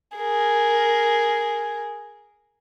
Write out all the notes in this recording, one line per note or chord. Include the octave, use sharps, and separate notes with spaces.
G#4 A#4